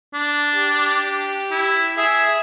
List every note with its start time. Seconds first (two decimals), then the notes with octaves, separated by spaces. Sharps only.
0.14 D4
0.55 G4
1.51 E4
1.98 G#4 E5